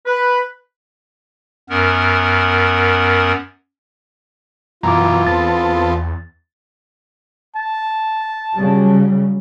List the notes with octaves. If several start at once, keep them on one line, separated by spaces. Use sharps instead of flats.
B4
F#2 B3 A#4
F#2 B2 E3 F4 A#5 D6
E2 B3 C4 A4 A6
A5
C#3 F#3 G3